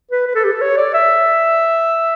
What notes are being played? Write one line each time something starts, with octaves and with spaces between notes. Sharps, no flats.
B4
B4
A4
G4
A4
C#5
D5
E5